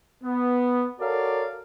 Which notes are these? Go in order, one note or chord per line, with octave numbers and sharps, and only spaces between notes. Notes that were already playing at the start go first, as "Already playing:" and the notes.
B3
F#4 A4 A#4 C#5 D5 F5